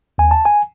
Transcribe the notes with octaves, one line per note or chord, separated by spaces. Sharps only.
D#2 G#5
A5
G#5